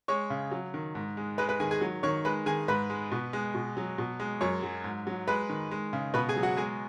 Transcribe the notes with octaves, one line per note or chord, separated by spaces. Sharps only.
G#3 C#5 C#6
C#3
F#3
D#3
G#2
G#3
G#3 B4 B5
B4 B5
D#3 G#4 G#5
G#4 G#5
F#3
D#3 C#5 C#6
G#3 B4 B5
D#3 G#4 G#5
G#2 B4 B5
G#3
B2
G#3
B2
F#3
B2
G#3
F#2 C#5 C#6
F#3
G#2
F#3
G#3 B4 B5
D#3
G#3
C#3
B2 B4 B5
G#4 G#5
F#3
F#4 F#5
G#3 G#4 G#5